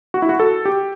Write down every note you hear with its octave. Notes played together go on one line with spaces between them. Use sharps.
F#4
E4
F#4
A4
G4